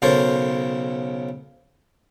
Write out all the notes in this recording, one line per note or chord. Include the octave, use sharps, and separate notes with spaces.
B1 C#3 A4 A#4 C5 C#5